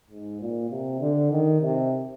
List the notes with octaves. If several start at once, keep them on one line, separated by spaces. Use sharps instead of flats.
G#2
A#2
C3
D3
D#3
C3